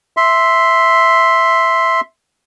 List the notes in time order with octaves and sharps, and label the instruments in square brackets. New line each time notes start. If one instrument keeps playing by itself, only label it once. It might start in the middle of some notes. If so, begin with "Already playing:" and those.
[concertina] E5 C6